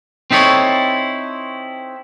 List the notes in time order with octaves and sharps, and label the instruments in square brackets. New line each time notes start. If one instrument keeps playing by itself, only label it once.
[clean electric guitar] C4 D#4 E4 A4 C#5